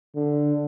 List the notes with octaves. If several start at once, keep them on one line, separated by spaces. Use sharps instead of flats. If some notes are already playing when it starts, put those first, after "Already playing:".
D3